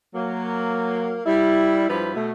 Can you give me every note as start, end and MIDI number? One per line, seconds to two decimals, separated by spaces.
0.14 1.20 54
0.14 1.20 58
1.26 1.87 55
1.26 1.87 64
1.89 2.11 43
1.89 2.11 53
1.89 2.11 54
1.89 2.11 64
1.89 2.11 71
2.14 2.31 47
2.14 2.31 57